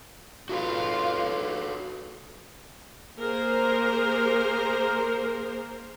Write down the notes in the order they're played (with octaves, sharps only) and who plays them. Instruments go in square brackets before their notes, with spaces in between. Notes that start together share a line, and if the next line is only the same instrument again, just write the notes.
[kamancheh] F4 F5 [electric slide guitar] F#4 A4 B4
[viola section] A#3 G#4 A#4 C5